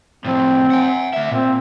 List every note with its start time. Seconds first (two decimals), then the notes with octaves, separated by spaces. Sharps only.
0.25 A2 F3 C4
0.70 F#5 G#5
1.13 D2 E5
1.31 A#2 C4